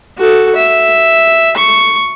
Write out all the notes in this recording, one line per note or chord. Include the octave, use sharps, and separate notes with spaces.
F#4 A4
E5
C#6